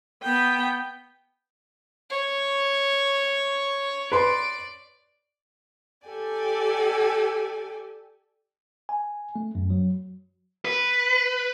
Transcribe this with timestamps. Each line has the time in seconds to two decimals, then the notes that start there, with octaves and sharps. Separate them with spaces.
0.23 B3 G5
2.10 C#5
4.12 B4 D5 C6
6.08 G4 A4 D5 G#5
8.89 G#5
9.36 A3
9.55 F#2
9.70 F#3
10.65 B4